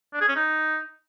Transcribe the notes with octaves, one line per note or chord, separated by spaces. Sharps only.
D4
G#4
C#4
D#4